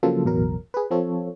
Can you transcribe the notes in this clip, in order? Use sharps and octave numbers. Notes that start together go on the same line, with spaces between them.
C#3 F3 F#3 A#3 F4 A4
A1 E2 B2 F#3 A#4
G#4 B4
F3 C4 F4 A4 C#5